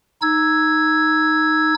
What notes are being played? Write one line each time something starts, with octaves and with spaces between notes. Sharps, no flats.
D#4 E6 G#6